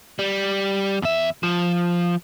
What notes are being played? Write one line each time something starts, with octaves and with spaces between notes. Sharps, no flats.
G3
E2 E5
F3